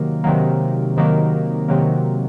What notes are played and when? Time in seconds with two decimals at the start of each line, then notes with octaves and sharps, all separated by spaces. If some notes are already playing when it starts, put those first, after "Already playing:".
Already playing: C3 D#3 F#3 A#3
0.24 C3 D#3 F#3 A#3
0.97 C3 D#3 F#3 A#3
1.69 C3 D#3 F#3 A#3